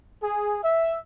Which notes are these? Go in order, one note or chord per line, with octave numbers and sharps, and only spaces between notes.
G#4
E5